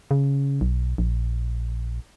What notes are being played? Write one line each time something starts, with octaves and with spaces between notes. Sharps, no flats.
C#3
B1
A#1